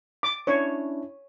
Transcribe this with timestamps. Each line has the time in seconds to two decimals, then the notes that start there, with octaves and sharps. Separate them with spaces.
0.23 D6
0.47 C#4 D4 E4 C#5